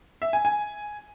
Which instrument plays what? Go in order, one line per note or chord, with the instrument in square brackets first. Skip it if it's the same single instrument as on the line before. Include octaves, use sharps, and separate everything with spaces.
[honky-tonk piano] E5
G#5
G#5